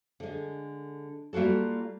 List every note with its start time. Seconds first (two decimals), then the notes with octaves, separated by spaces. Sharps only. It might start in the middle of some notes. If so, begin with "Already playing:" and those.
0.20 D3 G#3
1.33 G3 A#3 F4 F#4 A4